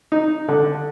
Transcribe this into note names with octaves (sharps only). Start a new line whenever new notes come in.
D#4
D3